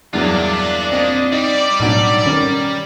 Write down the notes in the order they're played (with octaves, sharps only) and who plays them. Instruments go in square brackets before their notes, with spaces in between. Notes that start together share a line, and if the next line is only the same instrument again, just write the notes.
[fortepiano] E2 G2 F#3 [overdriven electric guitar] A#3 F4 [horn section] D4
[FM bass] C4 [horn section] D4 D#5
[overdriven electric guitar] G3 [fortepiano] D#4 [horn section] D5
[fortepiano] B1 F#3 D4 [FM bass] A2
[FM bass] D#3 [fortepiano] C#4 A#4